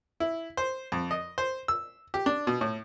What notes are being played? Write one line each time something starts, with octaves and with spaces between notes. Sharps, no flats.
E4
C5
F2
D#5
C5
E6
G4
D4
B2
A2